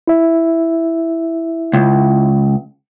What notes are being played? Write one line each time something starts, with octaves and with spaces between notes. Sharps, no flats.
E4 E5
C#2